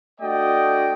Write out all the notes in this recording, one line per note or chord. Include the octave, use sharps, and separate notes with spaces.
A3 D4 F#4 D5 D#5 G5